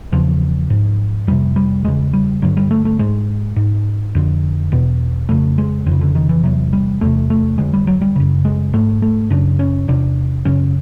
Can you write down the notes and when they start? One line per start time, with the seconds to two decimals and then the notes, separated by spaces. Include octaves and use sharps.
0.12 E2 C#3 F3
0.70 G#2
1.27 F2 C3 G3
1.56 G3
1.84 E2 C#3 G#3
2.13 G3
2.42 G2 D3 F#3
2.57 G3
2.71 A3
2.85 A3
2.99 G#2 G#3
3.56 G#2
4.15 F2 D3
4.72 E2 B2
5.29 F2 C#3 A3
5.58 G#3
5.86 F2 D3
5.91 C#3
6.01 D3
6.15 D#3
6.29 E3
6.43 E2 C3 F#3
6.73 G3
7.01 E2 C3 A3
7.30 A3
7.58 F2 D3 G#3
7.73 G3
7.87 F#3
8.01 G3
8.16 F#2 C#3
8.45 G#3
8.73 G#2 A3
9.02 A3
9.30 F#2 C#3 D4
9.59 C#4
9.88 E2 C3 D4
10.45 F#2 C#3 C#4